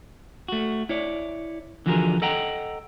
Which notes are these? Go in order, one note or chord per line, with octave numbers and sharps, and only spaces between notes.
A3 F#4
E4 C#5 D5
D3 E3 F3 F#4 G#4 A#4
A4 D#5 F#5 G5 A#5